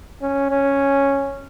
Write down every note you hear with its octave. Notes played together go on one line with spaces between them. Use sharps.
C#4
C#4